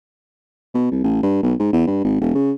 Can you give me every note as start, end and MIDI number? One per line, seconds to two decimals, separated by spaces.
0.74 0.89 47
0.92 1.02 36
1.03 1.18 33
1.23 1.41 43
1.43 1.54 35
1.59 1.70 44
1.73 1.86 40
1.87 2.03 43
2.04 2.16 32
2.21 2.33 28
2.35 2.52 49